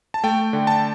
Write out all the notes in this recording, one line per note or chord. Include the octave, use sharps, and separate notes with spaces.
A5
A3 G5
D3
A5